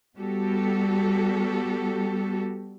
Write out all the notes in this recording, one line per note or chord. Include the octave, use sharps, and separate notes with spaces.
G3 B3 F#4 G4 A4